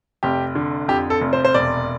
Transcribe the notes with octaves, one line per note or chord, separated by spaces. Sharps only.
F1 G4
D3
F2 G4
A4
F1
C5
C5
E1 D5